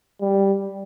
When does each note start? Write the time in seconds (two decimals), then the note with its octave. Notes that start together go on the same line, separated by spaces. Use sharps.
0.21 G3